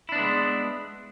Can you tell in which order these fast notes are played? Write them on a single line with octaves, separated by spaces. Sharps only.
E4 D4 B3 G#3